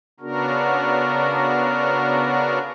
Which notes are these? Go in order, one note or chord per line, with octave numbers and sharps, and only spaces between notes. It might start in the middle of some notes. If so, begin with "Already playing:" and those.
C#3 B3 D4 F#4 A#4